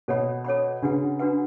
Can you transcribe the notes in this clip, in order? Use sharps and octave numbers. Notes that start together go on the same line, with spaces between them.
B2 A4 C#5 F#5 B5
A4 C#5 F#5 B5
C#3 D4 F#4 B4 F#5
D4 F#4 B4 F#5